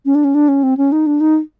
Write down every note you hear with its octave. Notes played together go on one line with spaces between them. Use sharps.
C#4
D4
C#4
D4
C#4
C4
C#4
D#4
D4
D#4